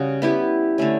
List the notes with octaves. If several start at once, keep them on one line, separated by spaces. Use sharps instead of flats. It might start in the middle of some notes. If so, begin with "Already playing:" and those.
Already playing: C#3 G3 C#4 F#4
B3 E4 G4
D3 A3 C#4